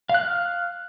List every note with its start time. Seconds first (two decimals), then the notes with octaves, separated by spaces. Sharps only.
0.09 F5
0.14 F#6
0.19 F6